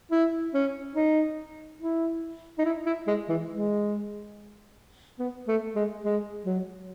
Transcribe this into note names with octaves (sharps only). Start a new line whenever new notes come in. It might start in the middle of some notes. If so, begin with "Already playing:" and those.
E4
C#4
D#4
E4
D#4
E4
E4
G#3
E3
G#3
B3
A3
G#3
G#3
F#3